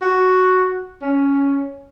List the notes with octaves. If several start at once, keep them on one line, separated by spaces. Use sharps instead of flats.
F#4
C#4